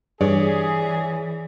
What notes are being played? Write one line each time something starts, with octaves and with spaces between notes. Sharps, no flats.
G2 E3 G#4 C#5 D5